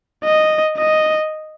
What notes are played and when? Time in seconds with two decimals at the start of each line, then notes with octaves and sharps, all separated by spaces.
0.24 D#5
0.77 D#5